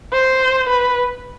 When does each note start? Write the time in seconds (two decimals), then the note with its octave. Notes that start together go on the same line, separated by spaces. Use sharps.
0.13 C5
0.69 B4